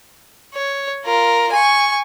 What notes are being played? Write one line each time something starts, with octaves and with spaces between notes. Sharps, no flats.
C#5
F4 A#4
G#5 C#6